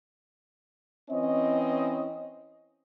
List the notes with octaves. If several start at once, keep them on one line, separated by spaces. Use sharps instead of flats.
E3 C4 C#4 D#5